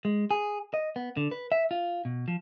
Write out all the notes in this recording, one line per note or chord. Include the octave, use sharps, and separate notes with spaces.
G#3
G#4
D#5
B3
D3
B4
E5
F4
B2
F3